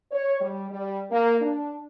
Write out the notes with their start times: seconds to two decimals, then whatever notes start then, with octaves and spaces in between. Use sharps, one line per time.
0.12 C#5
0.40 G3
0.71 G3
1.11 A#3
1.41 D4